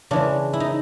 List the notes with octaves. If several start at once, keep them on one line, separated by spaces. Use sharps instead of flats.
C#3 E3 G#3 D4
E4
D#4